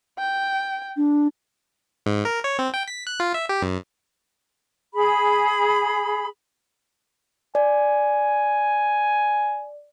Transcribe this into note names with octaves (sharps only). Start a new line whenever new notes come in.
G5
D4
G#2
A#4
C#5
C4
G5
B6
F#6
F4
E5
G4
F#2
G#4 B5
D5 G#5